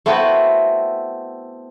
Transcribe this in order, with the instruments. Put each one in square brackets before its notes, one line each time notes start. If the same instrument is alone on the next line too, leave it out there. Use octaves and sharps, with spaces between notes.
[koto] A3 B3 C4 E4 F#4 B4